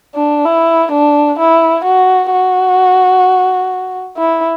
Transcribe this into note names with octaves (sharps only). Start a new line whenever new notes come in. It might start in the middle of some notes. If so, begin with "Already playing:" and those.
D4
E4
D4
E4
F#4
F#4
E4